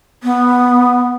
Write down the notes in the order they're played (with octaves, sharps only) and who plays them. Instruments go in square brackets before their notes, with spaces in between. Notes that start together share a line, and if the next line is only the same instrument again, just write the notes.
[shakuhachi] B3